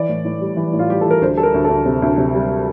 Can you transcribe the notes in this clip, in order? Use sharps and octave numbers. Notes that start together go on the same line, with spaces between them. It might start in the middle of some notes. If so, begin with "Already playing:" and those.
Already playing: E3 D5
A2
A2
G3
E3
A2
F4
G3 G4
E3 A4
A#4
D2 C5
G3 A4
A#4
D2
A4
D2
C3
D2
C3
G3